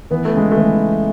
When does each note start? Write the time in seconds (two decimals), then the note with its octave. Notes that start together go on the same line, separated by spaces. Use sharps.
0.11 E3 B3
0.25 A3
0.34 C#3 G#3
0.51 A3
0.57 E3